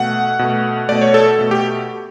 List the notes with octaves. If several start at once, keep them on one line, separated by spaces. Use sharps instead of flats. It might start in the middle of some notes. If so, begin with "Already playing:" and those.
Already playing: B2 A3 F#5
B2 A3
B2 A3 D5
C#5
A4
B2 A3
G4